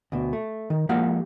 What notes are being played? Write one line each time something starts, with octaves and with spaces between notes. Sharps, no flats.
D2 B2
A3
D#3
F3 G#3 A#3 G4 F5 F#5